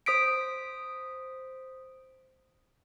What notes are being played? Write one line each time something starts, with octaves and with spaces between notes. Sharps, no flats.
C5 D#6 B6 D7